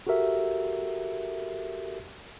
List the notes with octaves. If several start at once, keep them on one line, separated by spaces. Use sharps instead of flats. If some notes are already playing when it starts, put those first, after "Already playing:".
F#4 G4 A4 A#4 E5